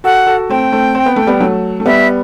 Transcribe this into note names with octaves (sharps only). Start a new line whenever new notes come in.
F#4 A4 F#5
F#4 A4
A3 C4 G5
A3 C4
C4
B3
A3
G3 B3
F#3 A3
A3
G3 B3 E5